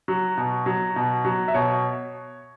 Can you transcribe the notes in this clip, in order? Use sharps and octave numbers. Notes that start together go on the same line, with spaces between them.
F#3
B2
F#3
B2
F#3
E5
B2 C#5